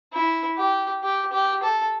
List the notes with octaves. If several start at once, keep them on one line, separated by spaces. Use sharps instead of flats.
E4
G4
G4
G4
A4